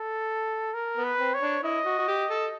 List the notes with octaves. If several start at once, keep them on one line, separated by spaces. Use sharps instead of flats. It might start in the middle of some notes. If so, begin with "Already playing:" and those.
Already playing: A4
A#4
B3
B4
C4
C#5
D4
E4 D#5
F#4
F#4
G4
A4